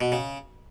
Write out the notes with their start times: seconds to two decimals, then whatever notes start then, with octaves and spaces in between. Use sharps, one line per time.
0.01 B2
0.12 C#3